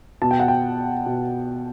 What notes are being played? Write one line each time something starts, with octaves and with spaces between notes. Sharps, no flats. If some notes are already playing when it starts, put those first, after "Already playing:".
B2 A5
G5
F#5
G5
B2